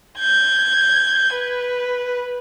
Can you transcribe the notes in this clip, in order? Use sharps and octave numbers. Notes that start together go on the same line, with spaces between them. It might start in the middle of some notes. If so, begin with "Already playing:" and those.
G6 G#6
B4